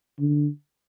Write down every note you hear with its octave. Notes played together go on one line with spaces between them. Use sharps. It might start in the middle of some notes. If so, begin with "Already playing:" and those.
D3